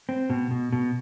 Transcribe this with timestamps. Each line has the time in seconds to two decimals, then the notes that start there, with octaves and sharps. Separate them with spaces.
0.09 C4
0.30 B2
0.51 B2
0.72 B2